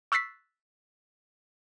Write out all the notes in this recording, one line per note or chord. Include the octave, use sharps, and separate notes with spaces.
C#6 E6 F#6 A6 B6 C7